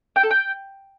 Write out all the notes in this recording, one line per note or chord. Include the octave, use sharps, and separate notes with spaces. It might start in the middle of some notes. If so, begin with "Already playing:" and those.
G5
A4
G5